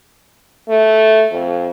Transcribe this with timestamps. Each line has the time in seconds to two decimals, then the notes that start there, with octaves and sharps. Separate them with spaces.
0.69 A3
1.32 F2